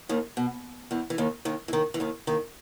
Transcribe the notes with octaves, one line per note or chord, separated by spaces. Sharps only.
D#2 D#3
B2
E2 E3
E3
D#2 D#3
D#2 D#3
E3
D#2 D#3
E3
D#2 D#3
D#2 D#3